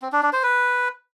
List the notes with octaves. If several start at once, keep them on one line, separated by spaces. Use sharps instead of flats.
C4
D4
D4
C5
B4